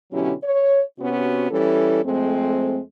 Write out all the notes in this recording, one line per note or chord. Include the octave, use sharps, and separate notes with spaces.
B2 D3 F#3 C#4 E4 G4
C#5
C3 B3 C#4 F#4
E3 G3 C#4 E4 A4
F2 G#3 A3 C4